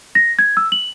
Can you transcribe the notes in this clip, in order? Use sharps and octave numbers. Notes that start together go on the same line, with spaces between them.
A#6
G#6
E6
F#7